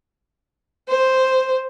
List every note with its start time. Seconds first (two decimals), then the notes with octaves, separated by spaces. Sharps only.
0.88 C5